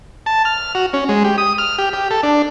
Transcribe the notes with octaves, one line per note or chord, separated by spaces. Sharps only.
A5
F6
F#4
C#4
G#3
G4
D#6
F6
G4
G4
A4
D4